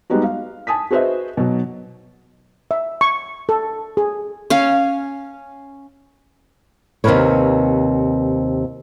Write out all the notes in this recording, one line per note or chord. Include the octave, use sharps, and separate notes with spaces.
G3 G#3 B3 D#4 F#4
F5
G#5 A5 D#6 B6
F#4 G#4 B4 C5 D#5 E5
B2 F#3
E5
C#6
A4
G#4
C#4 F5
D#2 C3 F#3 A#4 B4 C#5